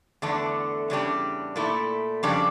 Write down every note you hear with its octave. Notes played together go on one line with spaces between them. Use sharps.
E2 D3 A3 D4
E2 C#3 G3 D4
A#2 A3 E4
F2 C#3 G3 D4